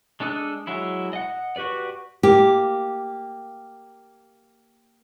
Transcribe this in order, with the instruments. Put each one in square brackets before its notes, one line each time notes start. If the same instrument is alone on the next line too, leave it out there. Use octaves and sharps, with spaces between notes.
[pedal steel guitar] G#3 D4 A4 D#5 F#6
F#3 G#3 E4
D#5 F#5
F#4 G4 B4 D5
[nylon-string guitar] A#3 G4